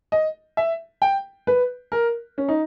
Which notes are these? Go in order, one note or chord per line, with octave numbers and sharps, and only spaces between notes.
D#5
E5
G5
B4
A#4
C#4
D#4